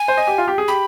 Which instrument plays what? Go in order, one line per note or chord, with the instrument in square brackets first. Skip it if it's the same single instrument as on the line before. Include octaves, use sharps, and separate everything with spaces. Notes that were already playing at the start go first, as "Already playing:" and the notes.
Already playing: [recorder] G#5
[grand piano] C5
D#5
G4
F4
G4
G#4
[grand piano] G4 [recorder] B5